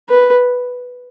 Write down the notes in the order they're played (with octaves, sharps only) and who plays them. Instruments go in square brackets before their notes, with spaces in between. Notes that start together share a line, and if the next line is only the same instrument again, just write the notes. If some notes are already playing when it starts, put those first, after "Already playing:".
[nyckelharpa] B4